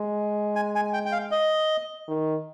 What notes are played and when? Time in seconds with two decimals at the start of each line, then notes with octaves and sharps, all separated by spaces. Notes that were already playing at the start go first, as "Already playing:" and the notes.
Already playing: G#3
0.55 G#5
0.75 G#5
0.93 G5
1.05 G5
1.12 F5
1.31 D#5
2.08 D#3